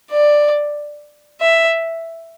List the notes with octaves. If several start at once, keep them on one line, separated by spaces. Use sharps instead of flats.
D5
E5